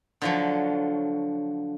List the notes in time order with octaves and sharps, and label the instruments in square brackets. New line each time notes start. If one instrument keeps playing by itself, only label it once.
[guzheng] D3 F3 F#3